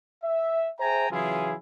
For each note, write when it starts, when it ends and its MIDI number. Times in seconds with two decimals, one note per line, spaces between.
0.24 0.70 76
0.80 1.10 68
0.80 1.10 72
0.80 1.10 76
0.80 1.10 79
0.80 1.10 80
0.80 1.10 82
1.11 1.55 49
1.11 1.55 52
1.11 1.55 54
1.11 1.55 64
1.11 1.55 65
1.11 1.55 68